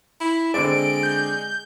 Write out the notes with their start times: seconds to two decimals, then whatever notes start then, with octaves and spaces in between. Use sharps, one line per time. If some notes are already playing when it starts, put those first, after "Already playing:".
0.20 E4
0.54 D3 G#3 C4 D5 D7
1.03 G6